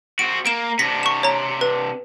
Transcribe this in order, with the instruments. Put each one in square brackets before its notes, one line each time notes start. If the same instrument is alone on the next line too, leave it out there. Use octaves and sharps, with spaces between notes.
[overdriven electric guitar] C4 F#4 [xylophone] D7
[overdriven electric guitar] A#3 [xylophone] D7 E7
[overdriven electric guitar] C3 D4 [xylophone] A#6 B6
[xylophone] C#6 E7
C#5 A#5
B4